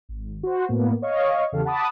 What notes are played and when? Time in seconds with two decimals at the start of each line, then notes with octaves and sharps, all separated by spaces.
0.09 G#1
0.43 F#4 C5
0.69 A2 A#3 B3
1.02 C#5 D#5 F5 C#6
1.52 E2 C#3 G4 A4 F5
1.65 F#5 A5 B5 D6 D#6